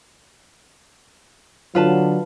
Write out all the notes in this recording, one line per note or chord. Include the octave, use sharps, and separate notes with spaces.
D3 F#3 F4 B4 A5